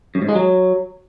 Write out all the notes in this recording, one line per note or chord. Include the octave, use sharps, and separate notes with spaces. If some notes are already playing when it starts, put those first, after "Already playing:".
F#2
G#2
G#3
F#3